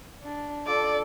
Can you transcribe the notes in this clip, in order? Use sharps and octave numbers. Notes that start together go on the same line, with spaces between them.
D4
D4 F4 A4 D5